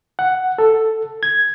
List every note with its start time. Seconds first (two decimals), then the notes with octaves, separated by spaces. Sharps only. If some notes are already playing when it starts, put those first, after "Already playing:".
0.19 F#5
0.58 A4
1.23 G#6